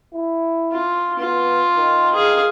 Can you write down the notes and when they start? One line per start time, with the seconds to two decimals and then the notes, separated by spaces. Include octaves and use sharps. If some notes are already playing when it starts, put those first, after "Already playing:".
0.13 E4
0.72 F4
1.19 B3 F4
1.77 D#3
2.15 G#4 F5